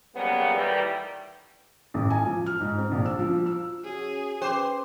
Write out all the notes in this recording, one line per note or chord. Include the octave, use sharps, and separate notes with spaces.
C#3 F#3 G3 A#3 B3
A2 D#3 E3 G3
A1
G#5
F3
F6
G#2
C4
A#1
E6
F3
E6
C#4 F#4 G#4
C#4 B4 C5 D6